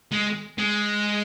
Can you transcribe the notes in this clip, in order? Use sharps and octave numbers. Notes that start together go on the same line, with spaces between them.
G#3
G#3